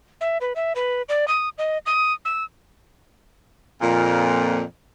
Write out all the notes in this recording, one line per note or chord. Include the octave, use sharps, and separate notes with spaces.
E5
B4
E5
B4
D5
D#6
D#5
D#6
E6
F2 A#2